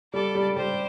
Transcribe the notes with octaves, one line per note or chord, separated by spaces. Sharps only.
G3 A4 D5
G3
G3 G4 C5